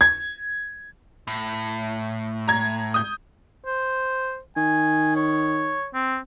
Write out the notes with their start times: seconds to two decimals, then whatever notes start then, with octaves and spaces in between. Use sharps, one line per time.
0.01 G#6
1.28 A2
2.48 A#5 G#6
2.94 D#6 G6
3.66 C5
4.57 D#3 G#5
5.16 C#5
5.94 C4